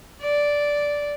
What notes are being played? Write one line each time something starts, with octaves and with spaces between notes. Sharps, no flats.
D5